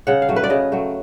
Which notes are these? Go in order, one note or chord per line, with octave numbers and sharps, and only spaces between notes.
C#3 F#5
F5
F#3 A3
B4
D5
C#3 D#5
F#3 A3